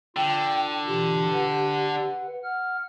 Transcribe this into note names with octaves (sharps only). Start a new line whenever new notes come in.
D3 F4 G5
B2 E3 F4 G4
B4 F#5
F#5 F6